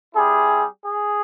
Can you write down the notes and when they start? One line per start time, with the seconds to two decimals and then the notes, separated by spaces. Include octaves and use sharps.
0.15 G3 C4 E4 G4 G#4
0.85 G#4